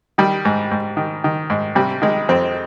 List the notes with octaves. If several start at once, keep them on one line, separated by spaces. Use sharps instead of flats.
D#3 G3
G#2
G#2
D#3
D#3
G#2
C3 G3
D#3 G#3
F2 C4